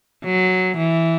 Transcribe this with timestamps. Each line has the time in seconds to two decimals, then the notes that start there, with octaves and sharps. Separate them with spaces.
0.25 F#3
0.77 E3